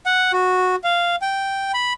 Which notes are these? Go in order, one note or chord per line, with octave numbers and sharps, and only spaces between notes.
F#5
F#4
F5
G5
B5